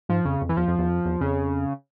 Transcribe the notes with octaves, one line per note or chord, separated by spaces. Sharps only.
G#2 F3
F2 C#3
F2
E3
E2 F3
F2
E2
F2
E2
F2 C#3